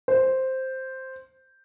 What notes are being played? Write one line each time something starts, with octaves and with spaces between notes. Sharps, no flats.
C5